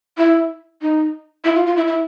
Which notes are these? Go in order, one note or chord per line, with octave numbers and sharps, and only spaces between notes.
E4
D#4
E4
F4
F4
E4
E4